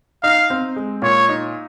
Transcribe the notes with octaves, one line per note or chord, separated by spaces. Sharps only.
D#4 F5
C4
G#3
A#2 C#5
D#4